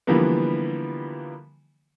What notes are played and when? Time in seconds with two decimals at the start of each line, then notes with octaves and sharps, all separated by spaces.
0.07 D3 E3 F3 G3 A#3 B3